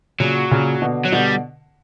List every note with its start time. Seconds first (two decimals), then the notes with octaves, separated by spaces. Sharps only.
0.20 A#2 C#3 F#3
0.51 A#2 C#3
0.82 B2 D3
1.05 F#3
1.12 B2 D3 G3